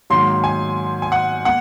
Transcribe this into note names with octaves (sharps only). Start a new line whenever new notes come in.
G#2 D#3 F#3 A#3 C6
G#5
G#5
F#5
A#3 F#5